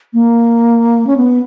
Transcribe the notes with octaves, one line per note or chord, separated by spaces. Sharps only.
A#3
C#4
B3